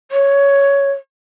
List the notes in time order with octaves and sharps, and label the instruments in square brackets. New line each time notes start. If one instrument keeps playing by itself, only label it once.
[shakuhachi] C#5